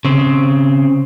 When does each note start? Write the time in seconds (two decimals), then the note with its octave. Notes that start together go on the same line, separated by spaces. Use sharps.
0.05 C#3 C4